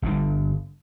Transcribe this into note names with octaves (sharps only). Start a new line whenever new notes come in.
G1 G2 D3